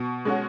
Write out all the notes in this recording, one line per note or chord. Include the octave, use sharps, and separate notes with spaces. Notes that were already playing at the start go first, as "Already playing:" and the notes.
Already playing: B2
G#3 C#4 F#4